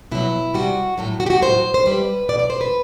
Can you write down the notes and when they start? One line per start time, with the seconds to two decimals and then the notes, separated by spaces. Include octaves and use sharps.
0.11 B2 F#3 E4
0.54 C3 G3 F#4
0.98 A2 F#3 A4
1.20 F#4
1.26 G4
1.30 F#4
1.42 A2 F#3 C5
1.74 C5
1.85 C3 G3 B4
2.28 B2 D5
2.33 F#3
2.39 D5
2.50 C5
2.61 B4